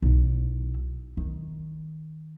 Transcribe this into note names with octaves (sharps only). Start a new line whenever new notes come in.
B1 E4
D#3